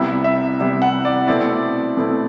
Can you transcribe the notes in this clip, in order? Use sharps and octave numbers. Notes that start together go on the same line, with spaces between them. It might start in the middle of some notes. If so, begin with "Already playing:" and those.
Already playing: C2 C3 G3 B3 E4 E5
E5
C2 C3 G3 B3 E4
F#5
D5
B2 A3 C4 E4 D5
B2 A3 C4 E4